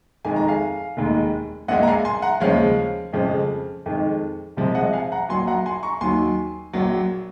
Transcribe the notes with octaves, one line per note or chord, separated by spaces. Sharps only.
F2 D#3 G#3 G#5
A#5
F5 G#5
F1 D#2 D#3 G#3
A#1 A#2 G#3 D#5 F#5
A#5
F5 G#5
G#5 C6
F#5 A#5
D#2 C#3 F3 G#3 C#5 F5
F2 C#3 F3 G#3
F2 D#3 G#3
C2 C3 F3 G#3
D#5 F#5
F5 G#5
F#5 A#5
A#1 A#2 F#3 G#5 C6
F#5 A#5
G#5 C6
A#5 C#6
D#2 D#3 F#3 G#5 C6
A#1 A#2 F#3